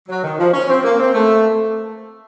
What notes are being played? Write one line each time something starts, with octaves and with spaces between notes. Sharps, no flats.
F#3
D#3
F3
C#4
C4
A#3
C4
A3